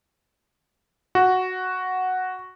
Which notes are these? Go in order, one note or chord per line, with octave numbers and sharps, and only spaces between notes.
F#4